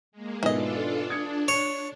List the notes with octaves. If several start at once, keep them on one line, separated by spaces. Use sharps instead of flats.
G#3 A#3
G#1 G#2 B2 E3 D4 F4 A4 D#5
D4 D#6 G#6 C#7
C#5